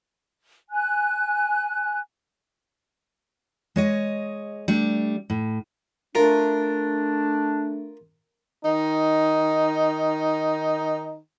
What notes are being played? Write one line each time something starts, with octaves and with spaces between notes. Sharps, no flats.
G#5 F#6
G#3 C#5 D#5
G3 A3 D4
A2
A3 D4 F4 A#4
D#3 D#4